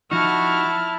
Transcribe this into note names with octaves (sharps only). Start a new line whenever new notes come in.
F3 D#4 E4 F#4 A5 F6